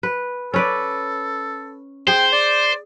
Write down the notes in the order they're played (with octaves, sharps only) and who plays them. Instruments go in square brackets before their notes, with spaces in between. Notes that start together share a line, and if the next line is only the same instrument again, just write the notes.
[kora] B4
[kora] C#4 B4 D5 [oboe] A4
[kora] G#4 [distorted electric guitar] C5 [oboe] G5
[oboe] D5